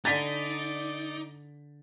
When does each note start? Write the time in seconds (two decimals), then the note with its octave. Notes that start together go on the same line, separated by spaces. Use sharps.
0.05 D3 D#4 D5 G#5 A#5 D6 A6 B6